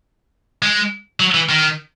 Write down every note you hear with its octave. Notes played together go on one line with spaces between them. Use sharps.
G#3
F#3
E3
D#3